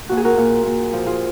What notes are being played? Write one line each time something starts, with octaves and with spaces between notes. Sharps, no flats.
A#2 F#4
G#4
F#4 A#4
A#2
A#2
F3
F4 G#4